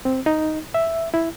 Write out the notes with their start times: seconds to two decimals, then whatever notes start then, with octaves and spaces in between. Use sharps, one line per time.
0.05 C4
0.26 D#4
0.74 E5
1.14 E4